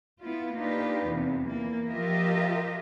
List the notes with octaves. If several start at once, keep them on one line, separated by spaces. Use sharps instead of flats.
B3 E4 F4
A#3 D4 D#4 F4 G4 B4
E2 C3
E3 A#3
F3 F4 G4 A#4 D#5 E5